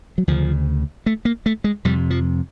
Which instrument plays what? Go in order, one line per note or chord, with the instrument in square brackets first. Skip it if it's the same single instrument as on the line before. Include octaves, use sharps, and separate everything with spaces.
[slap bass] F#3
D2 C#3 F3
A3
A#3
A3
G#3
F2 C3 G3
F3